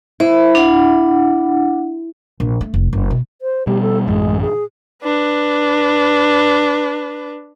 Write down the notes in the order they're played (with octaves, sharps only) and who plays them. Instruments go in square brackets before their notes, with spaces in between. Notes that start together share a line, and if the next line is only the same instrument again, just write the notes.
[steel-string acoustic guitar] E4 [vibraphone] C5
[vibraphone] D4 F#5
[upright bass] A#1
A3
F1
F#1
B2
[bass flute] C5
[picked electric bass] B2 G3 [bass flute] G4
[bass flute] A4
[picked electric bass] A1 F#2 [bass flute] G#3
[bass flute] G#4
[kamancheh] D4 B4